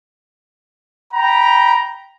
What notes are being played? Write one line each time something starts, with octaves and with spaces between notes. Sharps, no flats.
G5 A#5 B5